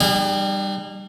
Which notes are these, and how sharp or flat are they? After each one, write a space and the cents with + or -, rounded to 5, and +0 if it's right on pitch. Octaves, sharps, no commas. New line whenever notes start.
G3 +0 D#4 -45 G#4 -35